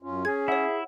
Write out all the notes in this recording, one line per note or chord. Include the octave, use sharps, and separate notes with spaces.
F#2 C#4 F4
C#4 G#4 G#6
E4 C#5 E5 F#5